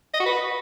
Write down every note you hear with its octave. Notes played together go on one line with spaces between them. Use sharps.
D#5
F#4
B4